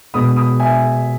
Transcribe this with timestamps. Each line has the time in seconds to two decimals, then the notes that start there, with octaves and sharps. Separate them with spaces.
0.14 B2 G#3 B3 B5 D#6
0.36 B5 D#6
0.60 E5 G#5